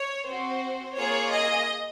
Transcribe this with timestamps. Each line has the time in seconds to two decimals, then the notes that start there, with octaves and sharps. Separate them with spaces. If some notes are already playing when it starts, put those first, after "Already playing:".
Already playing: C#5
0.25 C4 F#4 C5
0.97 A#3 F4 G#4 C#5
1.33 D#5